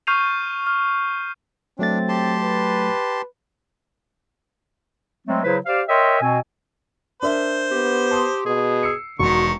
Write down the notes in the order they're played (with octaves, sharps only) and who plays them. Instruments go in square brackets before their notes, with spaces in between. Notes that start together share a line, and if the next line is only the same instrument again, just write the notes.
[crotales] C#6 F6 G6 C7 D#7 F7
F6
[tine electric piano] F#3 A3 A6 [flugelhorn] C4 [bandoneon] D4
[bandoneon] G4 A5 C6
[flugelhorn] B4
[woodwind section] F#3 G#3 A3 C4
C#3 F#3 E4 B4 C5
G4 C5 D5 F5
A#4 C#5 D#5 E5 G5 C6
B2 C4 G#5
[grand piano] D4 A#4 E5 [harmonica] C5
[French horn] B3 [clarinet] G4
[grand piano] A5 C6 D#6
[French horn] B2 [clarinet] G#4
[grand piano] E6 C7 C#7
[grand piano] E1 C6 C#7 [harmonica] D#3 [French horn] F#4 [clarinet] C#6